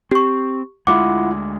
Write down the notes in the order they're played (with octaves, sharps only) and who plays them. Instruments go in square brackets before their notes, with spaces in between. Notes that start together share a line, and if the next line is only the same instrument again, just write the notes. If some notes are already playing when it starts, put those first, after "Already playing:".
[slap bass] C4 [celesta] G4 C#6
[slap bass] D2 G#3 [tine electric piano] E4 F4 F#5 [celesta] D6